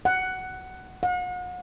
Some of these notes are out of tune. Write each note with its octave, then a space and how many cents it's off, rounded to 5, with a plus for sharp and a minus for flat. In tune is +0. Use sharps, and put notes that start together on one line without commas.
F#5 +10
F#5 -40